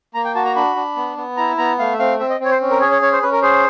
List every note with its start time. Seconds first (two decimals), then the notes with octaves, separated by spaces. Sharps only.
0.14 A#3 A#5
0.25 G5
0.35 F#4 A5
0.45 A#5
0.56 D4 B5
0.76 D4
0.96 B3
1.17 B3
1.37 E4 A#5
1.58 B3 A#5
1.79 A3 F5
1.93 E5
1.99 C4 F5
2.19 C4 E5
2.30 D#5
2.40 C4 C#5
2.51 C5
2.61 C#4
2.71 A#4
2.80 G#4 C#5
2.91 C#5
3.02 C#4 C#5
3.12 C5
3.22 C#4 B4
3.32 A#4
3.42 G#4 C5